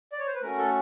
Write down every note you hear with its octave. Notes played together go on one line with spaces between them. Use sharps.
D5
C#5
C5
B4
A3 C#4 F#4 A#4
A4